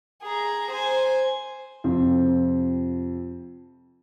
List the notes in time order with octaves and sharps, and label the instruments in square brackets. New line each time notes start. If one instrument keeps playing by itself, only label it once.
[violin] G#4 A#5
C5 G#5
[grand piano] F2 C3 C4